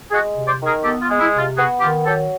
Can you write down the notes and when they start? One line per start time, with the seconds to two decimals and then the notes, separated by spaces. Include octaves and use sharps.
0.11 G#3 F#4 G#4
0.36 C3
0.47 C5 D5
0.60 D#3
0.65 G#4 A#4
0.83 B3 G4 A4
1.02 F4
1.08 G#3
1.20 E4
1.33 C3
1.38 F4
1.56 B3 F#4 G#4
1.80 D#3 F4 G4
2.05 F#3 G4 A4